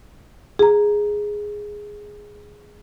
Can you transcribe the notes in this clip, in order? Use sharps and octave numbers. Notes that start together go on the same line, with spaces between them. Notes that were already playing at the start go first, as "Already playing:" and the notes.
G#4 A#5